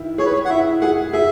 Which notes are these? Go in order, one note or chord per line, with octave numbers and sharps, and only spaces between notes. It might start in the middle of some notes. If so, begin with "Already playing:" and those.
Already playing: D#3 E4
G#4 C#5
B4
C#5
F#5
E4 E5
G#4 F#5
G#4 E5